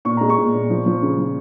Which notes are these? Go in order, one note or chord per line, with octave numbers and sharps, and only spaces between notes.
A#2 C#6
G#3 A#5
C#6
A#2
A#2
F3
F3
C#3
F3